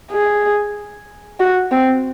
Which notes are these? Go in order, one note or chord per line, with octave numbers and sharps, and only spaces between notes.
G#4
F#4
C4